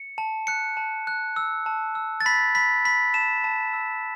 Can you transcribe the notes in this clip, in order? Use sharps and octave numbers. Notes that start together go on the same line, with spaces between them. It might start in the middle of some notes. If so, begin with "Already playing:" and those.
Already playing: C#7
A5
F#6 C#7
A5
F#6
E6
A5
E6
A6
B5 B6
B5 B6
B5 B6
A5 E7
A5
E6